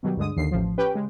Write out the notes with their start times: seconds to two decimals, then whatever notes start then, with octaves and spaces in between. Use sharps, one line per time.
0.03 B2 D#3 F#3 G3
0.17 D2 G2 D3 G#3 D#6
0.37 D#2 D3 C7
0.51 A1 F3
0.78 C#4 G4 B4 G5
0.94 C#3 G#3